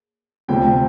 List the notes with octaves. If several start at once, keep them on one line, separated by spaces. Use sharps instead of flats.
D2 C3 F3 G5